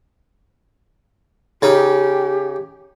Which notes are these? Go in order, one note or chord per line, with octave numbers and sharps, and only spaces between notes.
C#3 D#4 G4